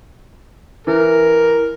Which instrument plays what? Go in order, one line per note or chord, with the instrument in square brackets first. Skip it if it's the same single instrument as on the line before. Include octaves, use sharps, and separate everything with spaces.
[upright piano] E3 [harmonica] A#4